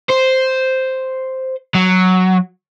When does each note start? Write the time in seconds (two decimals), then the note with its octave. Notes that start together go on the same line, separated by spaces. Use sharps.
0.10 C5
1.74 F#3